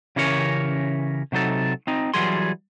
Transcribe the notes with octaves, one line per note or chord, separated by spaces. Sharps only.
C#3 E3 C#4 G4 A#4 C#5
C3 F#3 D#4 A4
C4 D#4
E3 F#3 G3 G#4 C6